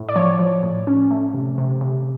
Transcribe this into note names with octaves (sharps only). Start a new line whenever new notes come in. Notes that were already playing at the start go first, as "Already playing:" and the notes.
Already playing: A2
D5
F3 C#5
F3
A2
C#4
A3
C3
C3
C3